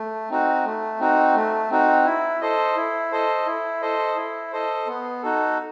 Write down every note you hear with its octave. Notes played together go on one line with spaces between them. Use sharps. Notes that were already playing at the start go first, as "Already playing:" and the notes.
Already playing: A3
C4 D#4 F#4
A3
C4 D#4 F#4
A3
C4 D#4 F#4
E4
A4 C5 D#5
E4
A4 C5 D#5
E4
A4 C5 D#5
E4
A4 C5 D#5
B3
D#4 F#4 A4